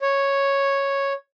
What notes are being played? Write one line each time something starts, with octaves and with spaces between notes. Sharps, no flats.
C#5